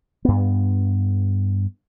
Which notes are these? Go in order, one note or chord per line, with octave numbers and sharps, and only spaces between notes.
G2 B3